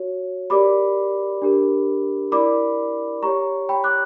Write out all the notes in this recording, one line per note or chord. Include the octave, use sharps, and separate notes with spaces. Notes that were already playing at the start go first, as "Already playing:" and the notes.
Already playing: F#4 C#5
G4 A#4 D5 B5 D6
D4 G4 A#4
E4 A#4 D5 B5 D6
G4 C#5 A#5 C#6
G5 B5
D6 F#6